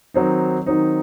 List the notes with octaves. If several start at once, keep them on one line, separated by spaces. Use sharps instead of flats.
D#3 F#3 C4 D#4
D#3 F#3 C4 D#4